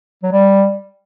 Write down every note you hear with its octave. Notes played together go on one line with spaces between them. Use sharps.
F#3
G3